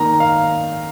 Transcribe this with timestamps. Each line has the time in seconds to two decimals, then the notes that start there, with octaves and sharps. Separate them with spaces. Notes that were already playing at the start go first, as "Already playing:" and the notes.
Already playing: D#3 A#3 D#4 A#5
0.20 F5